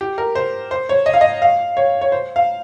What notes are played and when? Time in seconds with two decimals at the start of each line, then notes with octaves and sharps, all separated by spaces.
0.01 G4
0.18 A#4
0.35 C5
0.71 C5
0.89 C#5
1.06 D#5
1.14 F5
1.21 D#5
1.42 F5
1.77 C#5
2.01 C#5
2.12 C5
2.36 F5